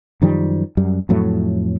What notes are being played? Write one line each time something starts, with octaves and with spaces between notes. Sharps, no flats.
F#2 D#3 F3 G3
F#2 G3
F2 A2 F#3 A3